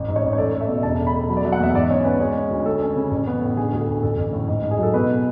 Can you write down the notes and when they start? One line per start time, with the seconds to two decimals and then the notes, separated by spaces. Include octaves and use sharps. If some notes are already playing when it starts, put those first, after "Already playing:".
Already playing: A1
0.08 G#2
0.16 C#5
0.23 A1
0.33 C#5
0.38 A3 D5
0.53 A3
0.61 E5
0.68 B2
0.83 E1 A5
0.98 A3
1.07 B5
1.14 A3
1.29 F#3 B5
1.37 D5
1.45 F#3 E5
1.52 F#5
1.60 E2 E5
1.74 G#2 D5
1.90 C#4 C#5
2.05 C#4 B4
2.21 G#3
2.35 C#4
2.51 D2
2.65 C#4 A4
2.82 C#4
2.96 C#3
3.11 A1
3.27 B3
3.41 A2
3.57 D3 G#4
3.73 D2 G#4
3.79 A4
3.88 D2
4.03 A1 A4
4.18 A1
4.33 A2
4.48 G#2
4.63 G#2
4.71 G#4
4.78 F#3 A4
4.94 B2 B4